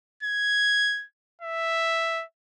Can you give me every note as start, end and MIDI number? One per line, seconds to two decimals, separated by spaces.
0.23 1.05 92
1.42 2.24 76